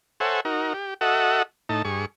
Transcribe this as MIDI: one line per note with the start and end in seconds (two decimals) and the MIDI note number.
0.20 0.40 69
0.20 0.40 72
0.20 0.40 73
0.20 0.40 76
0.20 0.40 78
0.20 0.40 80
0.45 0.73 63
0.45 0.73 66
0.45 0.73 70
0.74 0.94 67
1.01 1.43 66
1.01 1.43 69
1.01 1.43 75
1.01 1.43 76
1.01 1.43 78
1.69 1.82 45
1.69 1.82 63
1.69 1.82 81
1.85 2.05 43
1.85 2.05 68
1.85 2.05 85